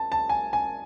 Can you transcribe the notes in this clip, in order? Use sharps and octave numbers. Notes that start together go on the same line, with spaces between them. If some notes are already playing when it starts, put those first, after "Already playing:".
Already playing: A5
A5
G#5
G#5